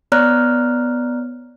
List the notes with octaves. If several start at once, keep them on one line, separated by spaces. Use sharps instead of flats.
B3 C#5 D5 A#5 F6 F#6